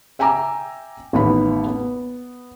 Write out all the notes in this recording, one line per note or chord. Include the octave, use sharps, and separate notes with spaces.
E5 G5 G#5 A#5 D6 E6
A1 D#2 B3 B5
B3